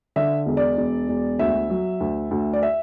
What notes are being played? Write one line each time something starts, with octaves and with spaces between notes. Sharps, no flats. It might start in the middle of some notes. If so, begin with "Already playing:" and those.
D3 E5
E1
D5
E1
E1
D2 E5
F#3
D2
D2
D5
E5